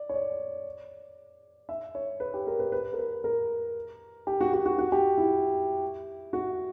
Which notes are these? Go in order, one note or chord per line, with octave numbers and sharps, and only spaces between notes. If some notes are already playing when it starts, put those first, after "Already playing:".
Already playing: D5
C#5
D5
E5
C#5
B4
G4
A#4
B4
B4
A#4
B4
A#4
G4
F#4
F#4
F#4
F#4
G4
E4
F#4